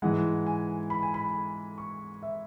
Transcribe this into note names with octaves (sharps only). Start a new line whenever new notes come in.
G#2 E3 G#3 F#5
G#5
B5
G#5
B5
C#6
E5